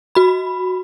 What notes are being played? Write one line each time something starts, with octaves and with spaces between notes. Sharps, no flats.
F#4 B5